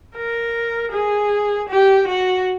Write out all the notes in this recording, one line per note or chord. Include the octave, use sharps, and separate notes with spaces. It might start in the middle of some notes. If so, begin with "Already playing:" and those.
A#4
G#4
G4
F#4